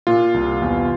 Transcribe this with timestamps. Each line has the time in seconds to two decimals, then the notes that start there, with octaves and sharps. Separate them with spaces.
0.07 A#2 F4
0.34 C2
0.62 E2